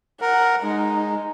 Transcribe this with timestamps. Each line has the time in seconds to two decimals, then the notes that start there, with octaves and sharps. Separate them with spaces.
0.21 A#4 F#5
0.63 G#3 D#4